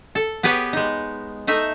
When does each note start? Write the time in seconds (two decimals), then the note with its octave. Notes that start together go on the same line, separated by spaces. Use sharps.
0.15 A4
0.43 B3 G4 G#4 B4 C#5 G5
0.73 G#3 D#4
1.47 A3 D#4 E5